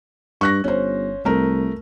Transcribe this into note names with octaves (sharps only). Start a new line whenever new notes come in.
G2 C#6 F#6 A#6
G1 C#4 C5
C2 A3 A#4